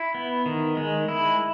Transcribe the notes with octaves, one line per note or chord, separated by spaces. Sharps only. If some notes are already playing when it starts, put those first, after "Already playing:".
Already playing: E4
B3
D#3
G#3
E4